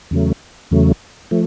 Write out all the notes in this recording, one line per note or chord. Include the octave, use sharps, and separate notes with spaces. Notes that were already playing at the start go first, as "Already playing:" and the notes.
E2 C#3 F#3 A3
E2 C#3 F#3 A3
F3 A3